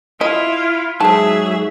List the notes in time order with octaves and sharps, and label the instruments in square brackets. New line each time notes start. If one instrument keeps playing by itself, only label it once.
[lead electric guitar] E4 [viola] F4 [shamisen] D#5
[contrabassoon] G#2 [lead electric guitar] F#3 [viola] G#4 E5 [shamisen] C5 A5